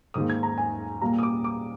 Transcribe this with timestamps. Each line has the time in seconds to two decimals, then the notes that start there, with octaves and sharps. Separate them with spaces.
0.14 G#2 D#3 A#3 D#6
0.30 G#6
0.43 A#5
0.58 G#5
1.01 A#2 G3 A#3 A#5
1.19 D#6
1.23 D6
1.44 D6